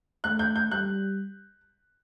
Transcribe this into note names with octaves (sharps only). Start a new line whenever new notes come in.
A3 F#6
G6
G6
G3 F#6